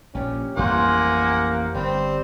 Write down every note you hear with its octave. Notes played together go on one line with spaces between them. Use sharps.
A#1 A#2 C#4 G4
A1 F2 G3 A#3 C5 F#5 G#5 C#6
G1 G3 C4 C5